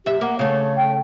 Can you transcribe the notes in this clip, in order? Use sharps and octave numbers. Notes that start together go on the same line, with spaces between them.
F#2 G4 E5
A#3 F#5
C#3 A3 C#5
G5